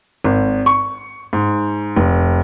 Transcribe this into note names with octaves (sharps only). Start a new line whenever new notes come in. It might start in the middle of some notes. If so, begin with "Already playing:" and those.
G#1
C#6
G#2
F1